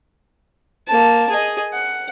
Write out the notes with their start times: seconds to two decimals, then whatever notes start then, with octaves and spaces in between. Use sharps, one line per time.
0.88 A#3 A5
1.30 G#4 D#5
1.73 F#5